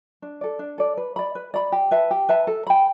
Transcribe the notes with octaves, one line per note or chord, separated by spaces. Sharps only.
D4
A4 D5
D4
A4 D5
B4
D5 B5
B4
D5 B5
G4
B4 E5 A5
G4
B4 E5 A5
A4
G5 B5